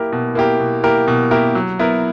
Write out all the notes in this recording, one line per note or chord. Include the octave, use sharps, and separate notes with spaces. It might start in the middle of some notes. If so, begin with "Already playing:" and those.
Already playing: A#3 E4 G4 A#4
B2
A#3 E4 G4 A#4
B2
A#3 E4 G4 A#4
B2
A#3 E4 G4 A#4
F#3
B3 E4 A#4